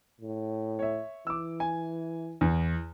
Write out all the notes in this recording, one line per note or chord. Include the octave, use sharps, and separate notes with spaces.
A2
C#5 E5
E3 D6 E6
G#5
E2